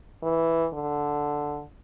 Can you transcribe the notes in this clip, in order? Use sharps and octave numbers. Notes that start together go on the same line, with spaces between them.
E3
D3